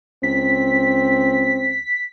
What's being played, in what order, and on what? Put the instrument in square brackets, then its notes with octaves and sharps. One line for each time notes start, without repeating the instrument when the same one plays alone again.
[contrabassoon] C#2 [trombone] C4 [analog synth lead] B6